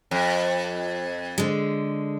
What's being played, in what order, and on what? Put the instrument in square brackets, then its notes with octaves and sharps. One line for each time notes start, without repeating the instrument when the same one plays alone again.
[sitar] F2
[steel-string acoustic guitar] D3 G#3